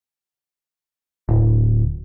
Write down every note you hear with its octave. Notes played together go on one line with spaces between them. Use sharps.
D1